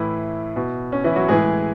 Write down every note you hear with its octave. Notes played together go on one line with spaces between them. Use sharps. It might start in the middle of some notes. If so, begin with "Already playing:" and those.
Already playing: A2 E3 E4
B2
C#4
E3 E4
F#3 F#4
A2 E3 G#3 G#4